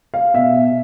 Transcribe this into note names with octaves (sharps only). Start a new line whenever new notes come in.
F5
B2 E5